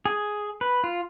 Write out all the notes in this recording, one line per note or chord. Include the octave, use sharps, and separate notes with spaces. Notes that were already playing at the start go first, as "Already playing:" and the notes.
G#4
B4
F4